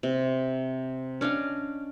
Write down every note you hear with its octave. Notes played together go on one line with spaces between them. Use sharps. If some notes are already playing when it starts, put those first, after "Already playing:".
C3
C#4 D4 D#5 F5